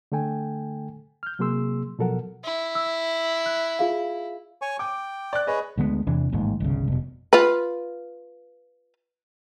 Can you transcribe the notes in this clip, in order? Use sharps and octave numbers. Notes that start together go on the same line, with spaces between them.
D3 A3 A4 G5 G#5
F6 G6
C3 F#3 A#3 G#4 C6 E6
B2 F3 F#3 A4 A#4 F#5
E4
E6
F#6
F4 G#4 F5
C#5 G#5 C#6
G5 D6
D5 F#6
G#4 B4 C#5 D#5
D2 D3 G#3 B3
E2 C3 E3 D4
A1 D#2 G#2
G1 C2 C#3
F1 B2
F4 B4